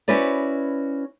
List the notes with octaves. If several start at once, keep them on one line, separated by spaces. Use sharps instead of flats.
C#4 E4 F#4 B4 C5 D5